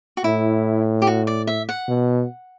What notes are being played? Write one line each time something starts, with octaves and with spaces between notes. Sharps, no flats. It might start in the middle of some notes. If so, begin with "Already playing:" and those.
F#4
A2 E4
G4
F#4
D5
E5
F#5
B2